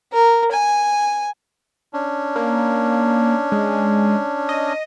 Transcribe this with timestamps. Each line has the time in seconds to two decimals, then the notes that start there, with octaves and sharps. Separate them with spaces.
0.13 A#4
0.52 G#5
1.93 C#4 D4
2.36 A#3
3.52 G#3
4.49 D#5